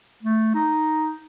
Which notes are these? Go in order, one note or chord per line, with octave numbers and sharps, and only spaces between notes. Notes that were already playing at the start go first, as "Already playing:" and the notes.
A3
D#4